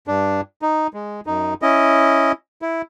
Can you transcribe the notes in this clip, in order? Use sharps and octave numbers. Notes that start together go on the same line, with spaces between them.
G2 D4
D#4
G#3
F#2 D#4
C#4 E4 D#5
E4